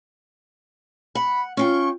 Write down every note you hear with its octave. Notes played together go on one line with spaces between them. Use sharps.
F#5 B5
C#4 F4 G5 C#6